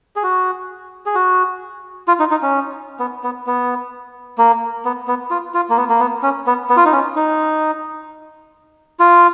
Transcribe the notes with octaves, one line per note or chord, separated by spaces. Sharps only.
G#4
F#4
G#4
F#4
F4
D#4
D#4
C#4
B3
B3
B3
A#3
B3
B3
F4
F4
A#3
B3
A#3
B3
C#4
B3
B3
F4
D#4
C#4
D#4
F4